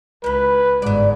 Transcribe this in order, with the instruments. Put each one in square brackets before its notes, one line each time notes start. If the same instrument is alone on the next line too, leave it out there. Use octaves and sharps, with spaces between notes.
[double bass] C#2 [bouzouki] D#3 E4 [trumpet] B4
[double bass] G1 G#2 [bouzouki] E3 D5